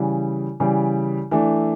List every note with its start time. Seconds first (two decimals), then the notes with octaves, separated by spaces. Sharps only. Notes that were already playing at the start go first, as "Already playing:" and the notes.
Already playing: C#3 E3 G3
0.60 C#3 E3 G3
1.31 E3 A3 D4